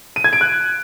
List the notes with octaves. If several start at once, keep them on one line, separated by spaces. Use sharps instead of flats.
D#7
G#6
D7
F#6